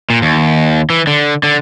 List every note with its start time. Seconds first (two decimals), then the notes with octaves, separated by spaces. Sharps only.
0.10 A#2
0.22 D#2
0.90 E3
1.07 D3
1.43 D3